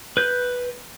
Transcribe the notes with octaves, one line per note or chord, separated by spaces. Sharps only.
B4 G6